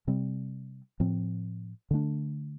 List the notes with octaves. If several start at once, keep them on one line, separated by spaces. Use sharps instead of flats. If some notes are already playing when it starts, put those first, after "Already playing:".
C3 G3 C4
A2 F3 C4
D3 A3 D4